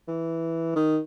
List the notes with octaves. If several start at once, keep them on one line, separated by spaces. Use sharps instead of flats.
E3
D#3